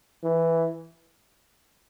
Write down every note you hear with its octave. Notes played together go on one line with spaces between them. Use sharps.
E3